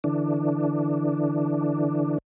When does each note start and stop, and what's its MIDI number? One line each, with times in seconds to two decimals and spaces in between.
0.04 2.18 50
0.04 2.18 52
0.04 2.18 62